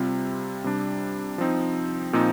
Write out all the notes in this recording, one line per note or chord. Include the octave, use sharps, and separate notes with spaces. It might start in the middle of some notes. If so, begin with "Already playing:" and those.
Already playing: C3 G3 C4 F4
C3 G3 D4
F3 C4 D#4
A#2 F3 C4 D#4